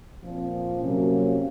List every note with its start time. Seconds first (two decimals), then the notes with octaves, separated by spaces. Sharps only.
0.20 A#2 F3 C4
0.80 C3 F#3 A#3 C#4